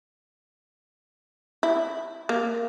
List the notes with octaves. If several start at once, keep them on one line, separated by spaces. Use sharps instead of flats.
E4
A#3